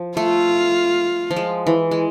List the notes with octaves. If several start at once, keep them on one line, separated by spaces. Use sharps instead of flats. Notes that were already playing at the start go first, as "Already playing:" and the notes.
Already playing: F3
A3 F4
F3
G#3
E3
G#3